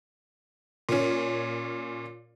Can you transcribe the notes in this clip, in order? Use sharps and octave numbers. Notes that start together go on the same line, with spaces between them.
A#2 C#4